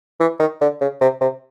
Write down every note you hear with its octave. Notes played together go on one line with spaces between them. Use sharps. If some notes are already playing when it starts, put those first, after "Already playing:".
E3
D#3
D3
C#3
C3
C3